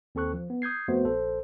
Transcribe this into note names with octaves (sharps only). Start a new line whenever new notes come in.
D#2 C4 A4 C#6 F#6
F3
B3
D#6 G6 G#6 C7
F2 A3 B3 F#4 C5
A#1 A4 C5